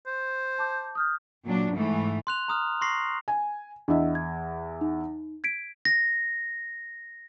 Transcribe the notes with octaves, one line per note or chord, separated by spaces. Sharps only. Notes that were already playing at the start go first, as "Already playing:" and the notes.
C5
A5 D6 G6
D#6 F6 G6
A#2 F#3 D4
G#2 E3 A3
C6 F#6 F7
A#5 D#6 F6
C6 C#6 A#6 C7
G#5
E2 D4 E4 D#5 E5
G#6
D#4
G#6 B6 D7
A#6